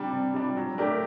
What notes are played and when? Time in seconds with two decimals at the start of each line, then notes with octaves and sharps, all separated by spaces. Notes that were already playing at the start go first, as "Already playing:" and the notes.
Already playing: C3 G3 D4
0.11 C3
0.34 G3 D4
0.57 F#3
0.78 A3 D4 G4 A#4